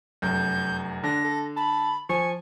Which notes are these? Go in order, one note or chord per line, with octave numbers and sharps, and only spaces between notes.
F1 F#2 G6
D3 D4 A#6
A4
A5 B5
F3 G#5 C#6